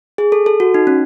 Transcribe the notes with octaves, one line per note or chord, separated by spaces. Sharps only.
G#4
A4
A4
F#4
D#4
C#4